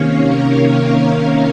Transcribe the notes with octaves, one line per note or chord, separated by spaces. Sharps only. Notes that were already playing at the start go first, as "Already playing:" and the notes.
Already playing: C3 D#3 A#3 C#4 C#5 F5
A#4 C#5